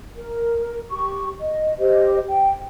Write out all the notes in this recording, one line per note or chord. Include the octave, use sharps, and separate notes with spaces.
A#4
G4 C#6
D#5
G4 C5 D#5
G5